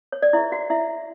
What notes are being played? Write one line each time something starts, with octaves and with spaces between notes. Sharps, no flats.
C#5
D5
E4 G#4 B4 E5
F#4 F#5
E4 E5